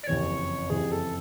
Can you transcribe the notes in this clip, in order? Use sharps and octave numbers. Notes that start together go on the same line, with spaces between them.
D5
F#1 F2 C3 E3 C#5
F#1 F2 C3 E3 G#4
A4